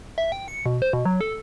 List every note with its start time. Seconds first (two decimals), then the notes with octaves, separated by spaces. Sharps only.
0.18 E5
0.32 G5
0.48 C#7
0.66 B2
0.82 C5
0.93 B2
1.05 F#3
1.21 A4